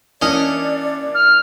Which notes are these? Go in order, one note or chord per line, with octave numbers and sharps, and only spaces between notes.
E3 A#3 C#4 D4 D5 D#5
F6